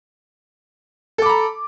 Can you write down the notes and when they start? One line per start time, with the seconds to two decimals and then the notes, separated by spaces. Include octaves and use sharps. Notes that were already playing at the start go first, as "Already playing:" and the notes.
1.18 A4
1.22 D6
1.26 B5
1.29 A#5